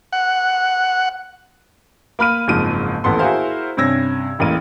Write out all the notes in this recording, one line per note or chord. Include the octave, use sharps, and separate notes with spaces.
F#5
A#3 B5 F6 D#7
F#1 G#2 F3 C4 D#7
D#1 A1 B3 A4 C6
E4 F#4 G#4 A#4 C5 F5
G2 C3 C#4 E6 G#6 A#6
E1 A1 A#3 D#7